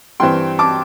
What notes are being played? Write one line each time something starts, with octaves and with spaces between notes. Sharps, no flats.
G2 E3 C4 G5 C6
A5 D6